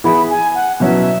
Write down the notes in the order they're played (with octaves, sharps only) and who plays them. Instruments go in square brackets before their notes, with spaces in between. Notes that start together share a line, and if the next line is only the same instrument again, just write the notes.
[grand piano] E3 B3 E4 G#4 [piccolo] B5
[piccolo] G#5
F#5
[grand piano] B2 F#3 C#4 E4 B4 [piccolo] E5